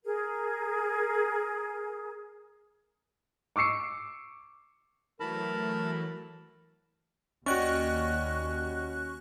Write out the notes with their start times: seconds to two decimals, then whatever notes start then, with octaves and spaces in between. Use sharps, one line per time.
0.05 G#4 A#4
3.56 C#6 D6 E6 C7 C#7
5.20 E3 F#3 A3 A#4 A5 B5
7.46 D#2 C#4 F#4 D5 D#5 G5 C#6 F#6